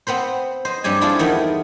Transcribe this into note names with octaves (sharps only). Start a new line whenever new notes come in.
B3 C4 B4 C5
C5 D#5
G2 G3 C4 G4 G#5
D4 E4 F4 G#4 A4 D5
E2 D#3 B3 G5